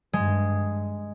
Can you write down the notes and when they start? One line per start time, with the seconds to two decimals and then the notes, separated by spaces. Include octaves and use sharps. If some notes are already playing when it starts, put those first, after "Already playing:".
0.13 G2 G#3